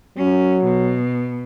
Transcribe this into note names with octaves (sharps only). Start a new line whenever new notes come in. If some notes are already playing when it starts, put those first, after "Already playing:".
F#3 C#4
B2